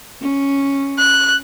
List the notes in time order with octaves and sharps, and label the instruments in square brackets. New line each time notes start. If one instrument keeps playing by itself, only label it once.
[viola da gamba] C#4
[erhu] F#6